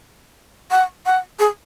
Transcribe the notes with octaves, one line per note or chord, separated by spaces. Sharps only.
F#5
F#5
G#4